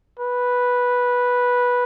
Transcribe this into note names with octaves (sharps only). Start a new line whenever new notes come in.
B4